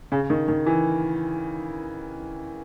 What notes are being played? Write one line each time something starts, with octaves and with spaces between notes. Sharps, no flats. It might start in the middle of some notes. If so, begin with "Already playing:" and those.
C#3
D#3
D#3
E3